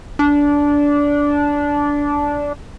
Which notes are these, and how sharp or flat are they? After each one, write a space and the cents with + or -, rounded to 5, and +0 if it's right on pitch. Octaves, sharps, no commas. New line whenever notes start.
D4 -15